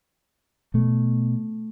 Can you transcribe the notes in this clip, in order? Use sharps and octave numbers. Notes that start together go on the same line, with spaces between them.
B2 A3